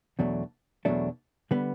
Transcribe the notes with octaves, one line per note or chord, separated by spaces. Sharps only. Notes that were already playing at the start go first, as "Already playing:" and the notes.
E2 B2 F#3 A3 D4
E2 B2 F#3 A3 D4
D3 G3 B3